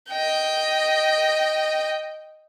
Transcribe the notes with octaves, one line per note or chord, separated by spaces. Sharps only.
D#5 G5